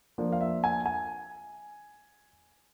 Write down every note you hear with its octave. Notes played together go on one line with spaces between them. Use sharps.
F3 A#3 D4
F5
E5
G#5
G#5